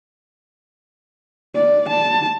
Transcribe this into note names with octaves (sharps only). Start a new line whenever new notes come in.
D5
A5